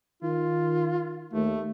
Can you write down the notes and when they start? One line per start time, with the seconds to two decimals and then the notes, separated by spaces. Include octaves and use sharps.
0.23 D#3 F4
1.33 D#2 A3